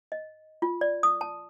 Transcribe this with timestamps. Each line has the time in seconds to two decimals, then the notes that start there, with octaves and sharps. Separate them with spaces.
0.12 D#5
0.62 F4
0.81 D5
1.03 D#6
1.21 A5